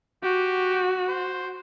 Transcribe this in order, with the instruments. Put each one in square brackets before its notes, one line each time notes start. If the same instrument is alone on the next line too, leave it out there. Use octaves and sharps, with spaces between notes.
[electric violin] F#4 [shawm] G4
[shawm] C5